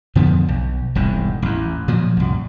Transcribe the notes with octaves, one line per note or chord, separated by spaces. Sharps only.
F2 D3 F3 B3
B1
E1 C2 G#2
A1 E2
A#2 F3 F#3
C2 F#2